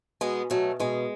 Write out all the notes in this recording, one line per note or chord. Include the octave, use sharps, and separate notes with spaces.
B2 G#3 B3
B2 F#3 A3
B2 G#3